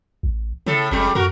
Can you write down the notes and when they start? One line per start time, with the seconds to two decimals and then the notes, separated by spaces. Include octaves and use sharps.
0.23 A1
0.66 A2 C#3 A4
0.91 F#1 F2 G3 G#3
1.15 F#2 F#4 A#4